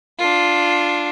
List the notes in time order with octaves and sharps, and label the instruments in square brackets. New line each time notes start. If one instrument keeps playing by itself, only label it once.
[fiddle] D4 F4